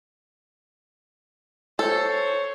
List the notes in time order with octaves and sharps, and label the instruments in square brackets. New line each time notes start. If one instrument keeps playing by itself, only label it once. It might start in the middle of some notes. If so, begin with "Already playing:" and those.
[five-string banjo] A4 [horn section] C5 C#5